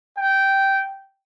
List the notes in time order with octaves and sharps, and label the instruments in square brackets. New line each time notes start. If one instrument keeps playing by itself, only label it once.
[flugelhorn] G5